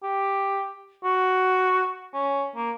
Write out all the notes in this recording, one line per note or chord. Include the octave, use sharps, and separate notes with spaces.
G4
F#4
C#4
A#3